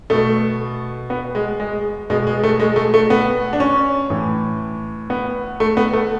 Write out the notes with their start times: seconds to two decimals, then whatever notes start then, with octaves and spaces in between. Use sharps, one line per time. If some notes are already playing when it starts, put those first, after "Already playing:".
0.10 B2 A3
1.10 B3
1.35 G#3
1.60 G#3
2.10 B2 G#3
2.27 G#3
2.43 A3
2.60 G#3
2.76 A3
2.94 A3
3.10 B3
3.53 D4
3.60 C#4
4.10 A2 E3
5.10 B3
5.60 A3
5.77 B3
5.93 A3